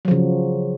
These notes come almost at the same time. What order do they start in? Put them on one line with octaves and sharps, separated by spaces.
F#3 F3 C#3